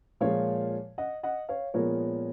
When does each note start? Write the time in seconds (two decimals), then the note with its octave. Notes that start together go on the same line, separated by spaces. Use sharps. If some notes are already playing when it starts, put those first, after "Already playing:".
0.20 A#2 F3 G#3 C#5 F5
0.98 D#5 F#5
1.23 D#5 F#5
1.49 C#5 F5
1.74 A#2 F3 G#3 B3 A#4 C#5